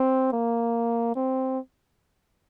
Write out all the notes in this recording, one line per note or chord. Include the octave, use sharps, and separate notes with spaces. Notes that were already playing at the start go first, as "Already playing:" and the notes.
Already playing: C4
A#3
C4